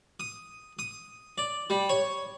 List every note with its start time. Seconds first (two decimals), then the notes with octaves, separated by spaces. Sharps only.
0.20 D#6
0.79 D#6
1.38 D5
1.70 G3
1.89 C#5